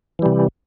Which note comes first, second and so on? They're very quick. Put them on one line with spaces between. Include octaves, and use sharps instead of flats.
E3 G3 C3